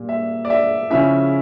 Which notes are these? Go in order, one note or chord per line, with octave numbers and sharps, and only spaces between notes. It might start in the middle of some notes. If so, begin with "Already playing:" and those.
Already playing: A#2 G3 A#3
E5
D5
E5
C#3 F3 C#4 E4 E5